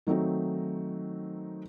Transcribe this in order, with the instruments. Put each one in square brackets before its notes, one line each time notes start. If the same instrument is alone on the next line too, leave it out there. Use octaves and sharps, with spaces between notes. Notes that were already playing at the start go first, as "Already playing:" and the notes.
[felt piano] D#3 F#3 A3 C4 D#4